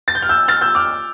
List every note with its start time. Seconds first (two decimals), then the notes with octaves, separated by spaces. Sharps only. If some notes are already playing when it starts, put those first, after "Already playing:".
0.08 A6
0.15 G6
0.22 F6
0.29 E6 G6
0.48 F6 A6
0.61 E6 G6
0.75 D6 F6